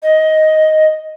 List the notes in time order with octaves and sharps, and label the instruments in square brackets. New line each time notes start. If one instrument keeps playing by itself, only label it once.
[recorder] D#5